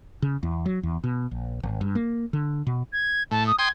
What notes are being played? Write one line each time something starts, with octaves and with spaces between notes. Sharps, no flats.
C#3
E2
F#3
E2
B2
A#1
G#1
G2
A#3
D3
B2
G#6
A2 A5
D#6
G5 C6 D#6 G#6